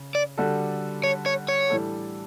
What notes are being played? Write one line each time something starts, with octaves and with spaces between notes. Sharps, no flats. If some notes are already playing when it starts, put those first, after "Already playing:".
Already playing: C#3
D5
D3 G3 D4 F#4 A4
C#5
C#5
C#5
A2 E3 G3 D4 A4